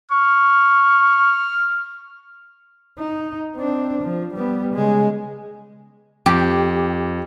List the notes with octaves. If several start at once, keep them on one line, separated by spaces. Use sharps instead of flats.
C#6 F6
D#4
C4 D4
F3
G3 B3
C#3 G#3
F2 G4